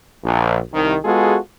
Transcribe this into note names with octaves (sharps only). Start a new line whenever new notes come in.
A#1
C2 D#3
G#3 B3 F4 F#4 G#4 A4